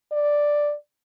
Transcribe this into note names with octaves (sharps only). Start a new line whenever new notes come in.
D5